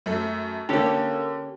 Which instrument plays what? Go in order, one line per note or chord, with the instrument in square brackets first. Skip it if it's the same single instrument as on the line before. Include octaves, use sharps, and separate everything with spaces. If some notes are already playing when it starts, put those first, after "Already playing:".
[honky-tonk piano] F#2 A3
[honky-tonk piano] D3 A#3 [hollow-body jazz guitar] C#4 G4 A4